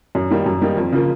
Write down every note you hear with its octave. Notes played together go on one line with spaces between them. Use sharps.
F#2
D#3 G3 A#3 D#4
F#2
D#3 G3 A#3 D#4
F2
C#3 F3 A#3